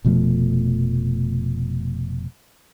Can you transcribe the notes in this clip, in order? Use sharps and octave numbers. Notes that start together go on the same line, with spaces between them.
F1 B2 F3 A3